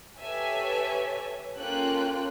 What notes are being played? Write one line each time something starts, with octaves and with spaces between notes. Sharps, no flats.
G4 A4 B4 C#5 E5 G#5
A#3 C#4 F4 A4 G5 F#6